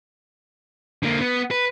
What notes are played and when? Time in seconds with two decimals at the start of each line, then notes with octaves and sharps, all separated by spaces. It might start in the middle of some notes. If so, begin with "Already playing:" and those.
1.03 D3 A#3
1.21 B3
1.51 B4